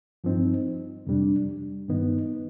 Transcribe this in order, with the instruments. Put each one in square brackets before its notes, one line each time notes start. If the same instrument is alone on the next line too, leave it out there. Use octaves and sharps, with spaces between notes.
[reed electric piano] G2 F3 C4 D#4
F2 C3 G3 D4
G2 D#3 B3 D#4